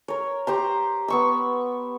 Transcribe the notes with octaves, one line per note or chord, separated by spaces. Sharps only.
A#4 C#5
G4 C5 A#5
B3 C#6 E6